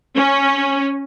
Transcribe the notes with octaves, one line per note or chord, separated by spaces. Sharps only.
C#4